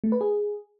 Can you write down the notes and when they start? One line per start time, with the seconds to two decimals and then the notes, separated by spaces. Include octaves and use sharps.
0.04 A3
0.12 B4
0.21 G#4